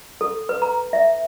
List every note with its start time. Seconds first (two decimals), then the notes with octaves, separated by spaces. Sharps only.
0.21 A4
0.49 B4
0.62 A#5
0.93 E5